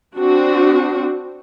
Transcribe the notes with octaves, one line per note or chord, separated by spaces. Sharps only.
C4 D4 F#4